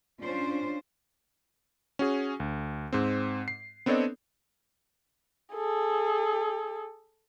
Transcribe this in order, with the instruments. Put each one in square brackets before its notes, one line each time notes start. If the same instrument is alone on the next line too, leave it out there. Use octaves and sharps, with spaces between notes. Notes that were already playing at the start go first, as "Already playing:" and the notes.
[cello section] C#4 D4 F4 C5
[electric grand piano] C#4 F#4 G#4
D2
G#2 C4
C7
B3 C4 D4 A4 C#5 D#5
[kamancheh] G#4 A4